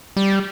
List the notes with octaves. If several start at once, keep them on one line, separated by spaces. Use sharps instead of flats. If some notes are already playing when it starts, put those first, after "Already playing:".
G3